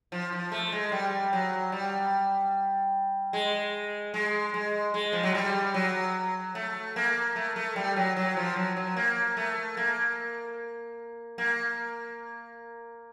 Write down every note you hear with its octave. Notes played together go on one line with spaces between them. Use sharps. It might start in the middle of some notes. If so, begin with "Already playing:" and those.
F3
F3
A3
G#3
G3
F#3
G3
G#3
G#3
G#3
G#3
F3
F#3
G3
F#3
A3
A#3
A3
A3
G3
F#3
F#3
F3
F#3
F#3
A#3
A3
A#3
A#3